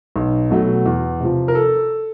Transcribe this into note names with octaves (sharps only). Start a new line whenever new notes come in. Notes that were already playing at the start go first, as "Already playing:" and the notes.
B1
B2 F#3 A3
E2
C3 F3
A#4
A4